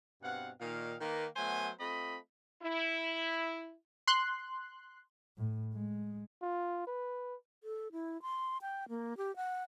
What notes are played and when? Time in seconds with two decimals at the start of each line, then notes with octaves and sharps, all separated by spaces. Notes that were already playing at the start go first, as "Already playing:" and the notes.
0.22 G2 B2 C4 F5 F#5
0.60 A#2 D#3 F5
1.01 D#3 A#3 B4
1.36 F#3 A3 B3 C5 E5 G#5
1.80 A3 C4 F4 D#5 B5
2.63 E4
4.07 C6 F#6
5.38 A2
5.74 G#3
6.42 F4
6.87 B4
7.64 A4
7.92 E4
8.22 C6
8.62 G5
8.89 A#3
9.17 G4
9.36 F#5